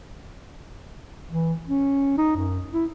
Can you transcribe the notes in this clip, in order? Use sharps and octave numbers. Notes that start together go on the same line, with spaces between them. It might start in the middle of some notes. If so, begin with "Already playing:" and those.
E3
C#4
D#4
F#2
E4